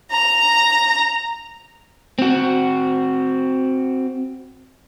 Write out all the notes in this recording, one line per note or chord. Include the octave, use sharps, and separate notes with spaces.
A#5
C4 F#4